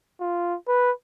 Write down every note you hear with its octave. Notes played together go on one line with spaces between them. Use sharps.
F4
B4